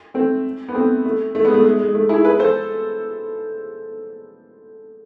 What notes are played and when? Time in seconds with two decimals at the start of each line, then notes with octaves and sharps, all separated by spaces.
0.14 A3 C4
0.69 B3
0.75 A3 C4
1.05 A3
1.35 A3
1.44 G#3 B3
1.54 A3
1.64 G#3
1.80 G#3
1.95 A3
2.09 E4 G#4
2.25 G#4 B4
2.39 A4 C5